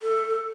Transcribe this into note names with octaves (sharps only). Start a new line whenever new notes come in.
A4